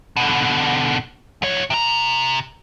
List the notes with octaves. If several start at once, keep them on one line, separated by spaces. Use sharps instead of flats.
B2 D3
C2 C#5
C3 A#5